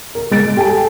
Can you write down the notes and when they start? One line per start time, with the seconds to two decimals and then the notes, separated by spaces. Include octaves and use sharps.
0.15 A#4
0.31 G#3 A6 D7
0.57 G4 A4 G#5 A5